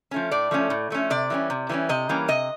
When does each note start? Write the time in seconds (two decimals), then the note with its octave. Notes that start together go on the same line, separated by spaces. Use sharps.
0.11 F3 A3 C#4
0.31 A2 D5
0.51 F3 A3 C#4
0.70 A2
0.90 F3 A3 C#4
1.10 C3 D5
1.30 E3 G3 A#3 C#4
1.50 C3
1.69 E3 G3 A#3 C#4
1.89 C3 D#5
2.09 E3 G3 A#3 C#4
2.28 C3 D#5